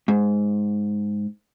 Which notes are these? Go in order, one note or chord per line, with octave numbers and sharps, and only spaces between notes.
G#2